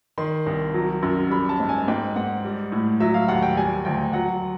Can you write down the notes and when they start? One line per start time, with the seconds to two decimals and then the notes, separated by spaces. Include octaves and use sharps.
0.18 D#3 C6
0.46 C2
0.74 F#3
1.03 F#2
1.30 G3 B5
1.49 A5
1.60 G#2
1.69 G#5
1.88 G#2 G5
2.16 G#2 F#5
2.45 G3
2.72 A2
3.00 F#3 E5
3.14 F5
3.28 D#2 F#5
3.42 G5
3.57 G3 G#5
3.85 D2 G5
4.13 F#3 F#5